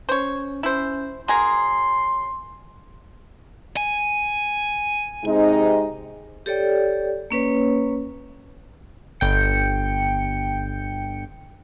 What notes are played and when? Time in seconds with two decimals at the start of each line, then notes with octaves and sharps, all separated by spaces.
0.09 C#4 C5 C#5
0.63 C#4 E4 C5
1.28 F#3 G#4 A#4 C6
3.77 G#5
5.25 C3 G#3 D#4
6.46 G4 A4 C#5 D5 G5
7.30 A#3 C#4 B4 C#5
9.20 G1 G5 C#7